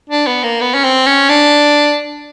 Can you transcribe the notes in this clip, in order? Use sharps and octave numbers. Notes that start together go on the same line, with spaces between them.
D4
B3
A#3
B3
C#4
C4
C#4
D4